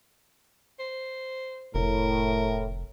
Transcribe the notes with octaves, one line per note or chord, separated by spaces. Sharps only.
C5
F1 A2 A#4